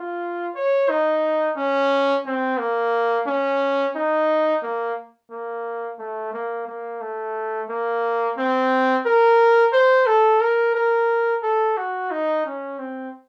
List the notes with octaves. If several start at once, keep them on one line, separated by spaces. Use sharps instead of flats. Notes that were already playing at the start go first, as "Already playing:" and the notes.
Already playing: F4
C#5
D#4
C#4
C4
A#3
C#4
D#4
A#3
A#3
A3
A#3
A#3
A3
A#3
C4
A#4
C5
A4
A#4
A#4
A4
F#4
D#4
C#4
C4